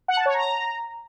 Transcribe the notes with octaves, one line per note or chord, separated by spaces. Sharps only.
F#5
A5
C#5
A#5